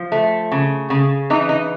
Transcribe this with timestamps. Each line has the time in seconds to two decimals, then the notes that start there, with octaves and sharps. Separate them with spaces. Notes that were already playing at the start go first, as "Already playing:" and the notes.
Already playing: F3
0.12 A3
0.52 C#3
0.90 C#3
1.30 E3 D#4
1.49 D#4